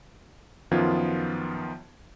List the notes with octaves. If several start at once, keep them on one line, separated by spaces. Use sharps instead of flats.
F#2 D#3 F3 B3 F4 G#6